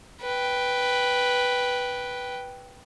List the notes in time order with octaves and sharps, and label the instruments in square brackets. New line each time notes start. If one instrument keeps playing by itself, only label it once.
[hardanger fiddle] B4 G5